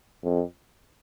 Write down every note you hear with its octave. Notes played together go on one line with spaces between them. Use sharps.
F2